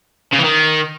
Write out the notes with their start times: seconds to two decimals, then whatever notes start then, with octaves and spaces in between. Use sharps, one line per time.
0.33 C#3
0.39 E3
0.44 D#3